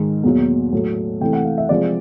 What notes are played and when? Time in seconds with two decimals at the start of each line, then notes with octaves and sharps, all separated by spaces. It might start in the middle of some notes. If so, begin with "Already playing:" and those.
Already playing: G#2 D#3 G#3
0.23 E2 B2 F#3 A#3
0.73 A2 F#3 A3
1.21 C3 E3 A3 G5
1.33 F#5
1.45 F5
1.58 E5
1.69 C3 F3 G#3 D5